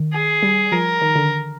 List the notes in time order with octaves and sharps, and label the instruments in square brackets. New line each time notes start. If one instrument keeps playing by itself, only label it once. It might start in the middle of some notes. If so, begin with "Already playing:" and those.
Already playing: [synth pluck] D#3
[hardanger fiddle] G#4
[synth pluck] G3
[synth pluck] F3 [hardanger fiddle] A#4
[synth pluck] D#3
D3